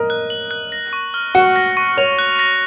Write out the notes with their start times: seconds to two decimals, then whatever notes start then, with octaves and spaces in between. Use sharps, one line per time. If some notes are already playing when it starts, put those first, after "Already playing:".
Already playing: A#4 D#5
0.10 F#6
0.30 F#7
0.51 F#6
0.72 A#6
0.93 C#6
1.14 F6
1.35 F#4 C#7
1.56 A#6
1.77 C#6
1.97 C#5 F7
2.19 F#6
2.39 A#6